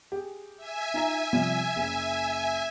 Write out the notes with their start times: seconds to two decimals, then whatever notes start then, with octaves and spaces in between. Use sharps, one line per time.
0.12 G4 G#4
0.57 E5 G#5
0.94 D#4 F4 A#5
1.33 C3 F3 G3
1.76 F#1